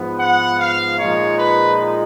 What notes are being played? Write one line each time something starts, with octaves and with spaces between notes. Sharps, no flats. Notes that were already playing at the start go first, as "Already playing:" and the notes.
Already playing: G#2 F3 B3
F#5
F5
A#2 F3 G#3 D#4 C#5
B4